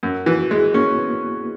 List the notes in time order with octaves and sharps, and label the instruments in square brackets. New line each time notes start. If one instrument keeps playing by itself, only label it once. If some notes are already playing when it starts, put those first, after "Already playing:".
[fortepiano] F#2
[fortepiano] E3 [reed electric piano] F#4
[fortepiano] G#3 [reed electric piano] E4
[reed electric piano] A#3 [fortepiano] C#4
[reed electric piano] B3